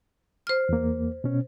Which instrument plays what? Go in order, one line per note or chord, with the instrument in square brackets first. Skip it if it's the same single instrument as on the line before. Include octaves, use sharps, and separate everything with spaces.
[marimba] C5 F6
[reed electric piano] E2 A#3
B2 C#4